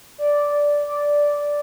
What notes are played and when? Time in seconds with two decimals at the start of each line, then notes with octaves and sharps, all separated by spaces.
0.18 D5
0.87 D5